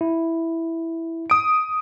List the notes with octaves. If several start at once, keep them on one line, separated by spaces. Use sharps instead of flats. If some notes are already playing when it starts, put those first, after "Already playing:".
E4
D#6 D7